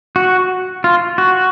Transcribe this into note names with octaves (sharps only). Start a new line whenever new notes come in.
F#4
F4
F#4